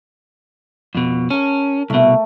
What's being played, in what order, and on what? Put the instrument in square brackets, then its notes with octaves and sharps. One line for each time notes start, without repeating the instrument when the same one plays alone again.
[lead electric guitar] F2 B2
[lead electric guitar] C#4 [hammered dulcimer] A#4 A5
[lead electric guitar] C2 B2 [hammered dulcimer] A3